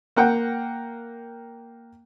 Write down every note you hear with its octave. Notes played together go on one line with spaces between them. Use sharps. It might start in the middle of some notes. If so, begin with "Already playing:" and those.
A#3 F#5 G5